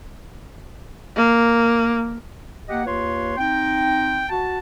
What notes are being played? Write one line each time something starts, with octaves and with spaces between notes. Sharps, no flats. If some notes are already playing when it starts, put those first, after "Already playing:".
A#3
A#3 G4 D#5 F#5
D#2 F4 B4 C#5 C6
C4 D#4 G5
F#4 A5